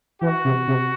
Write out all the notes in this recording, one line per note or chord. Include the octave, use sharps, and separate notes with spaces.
E3 F#4
C3
C3